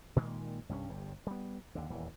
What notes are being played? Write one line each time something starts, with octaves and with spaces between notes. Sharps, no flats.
A#2 D#3 G#3 A#3
C2 G2 C4 C#4
G1 G2
G3 B3
D#2 D3
D#1 E2 E3